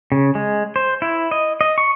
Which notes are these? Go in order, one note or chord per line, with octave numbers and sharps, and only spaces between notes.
C#3
G#3
C5
E4
D#5
D#5
C#6